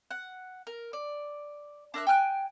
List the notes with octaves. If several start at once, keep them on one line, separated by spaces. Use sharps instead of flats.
F#5
A#4
D5
D4 A#4 E5 F#6
G5 G#5 F6 F#6